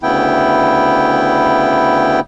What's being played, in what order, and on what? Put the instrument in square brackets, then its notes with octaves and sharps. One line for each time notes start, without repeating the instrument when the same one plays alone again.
[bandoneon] D2 C#3 B3 E4 G5